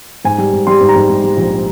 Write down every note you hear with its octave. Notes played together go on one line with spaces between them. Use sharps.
G#2 G#5
G3
G#2
G3 C6
G#2
A#5
G#2
G#2
G3
A#1